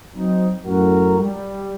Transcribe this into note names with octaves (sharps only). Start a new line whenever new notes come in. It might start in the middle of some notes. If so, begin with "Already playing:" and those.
F#3 C4 D#4
F#2 A2 F#4 A#4
G3